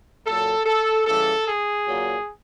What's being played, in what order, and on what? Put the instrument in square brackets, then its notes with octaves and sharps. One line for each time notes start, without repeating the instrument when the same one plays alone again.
[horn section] A#2 F#3 A4
A4
C#3 E3 G3 A4
G#4
A#2 F#3